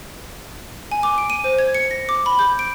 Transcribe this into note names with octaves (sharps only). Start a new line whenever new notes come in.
G#5
D6
D7
D#7
C5
G#6
C#7
A#6
D6
B5
G6
D7